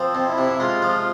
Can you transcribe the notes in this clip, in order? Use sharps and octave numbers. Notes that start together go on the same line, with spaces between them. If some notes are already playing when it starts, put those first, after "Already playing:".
Already playing: F3 C4
F2
E4
C3
G#3 F4
F3